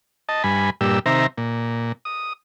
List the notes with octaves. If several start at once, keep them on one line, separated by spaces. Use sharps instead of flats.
D#5 A5
G2 G#5 B5
G2 A#2 G4 E6
C3 D#3 C5 E5 A#5
A#2
D#6